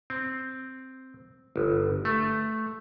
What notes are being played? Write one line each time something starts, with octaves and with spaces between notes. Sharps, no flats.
C4
G1
A3